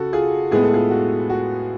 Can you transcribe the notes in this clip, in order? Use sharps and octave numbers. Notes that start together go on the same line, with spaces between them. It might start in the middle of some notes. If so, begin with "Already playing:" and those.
Already playing: C#3 F#4 A4
F4 G#4
A2 G#3 B3 G#4
A4
F4 G#4
F#4
F#4